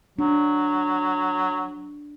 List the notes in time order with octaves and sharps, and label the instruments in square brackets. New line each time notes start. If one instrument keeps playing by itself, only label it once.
[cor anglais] F#3 [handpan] D4